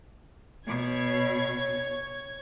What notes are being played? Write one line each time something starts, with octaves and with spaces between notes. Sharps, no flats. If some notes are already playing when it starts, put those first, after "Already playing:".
B2 C#5 G#6